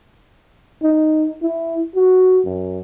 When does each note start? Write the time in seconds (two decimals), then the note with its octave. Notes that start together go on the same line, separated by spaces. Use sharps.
0.83 D#4
1.42 E4
1.95 F#4
2.45 F#2